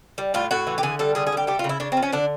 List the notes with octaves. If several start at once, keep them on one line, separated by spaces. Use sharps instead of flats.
G3
A2 F4
A2 F#4
E3
G4
D3 G#4
G3 A4
D3 G#4
G#4
G3 G4
A3 G4
F4
C#3
E4
C#3 D4
C4
F3
C#4
D3 D4